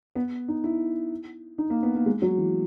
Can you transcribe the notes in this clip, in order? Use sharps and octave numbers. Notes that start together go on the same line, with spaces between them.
B3
D#4
E4
D#4
A#3
B3
A#3
G#3
F#3
E3